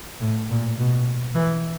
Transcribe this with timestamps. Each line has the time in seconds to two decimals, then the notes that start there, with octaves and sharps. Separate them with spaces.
0.20 A2
0.49 A#2
0.78 B2
1.35 E3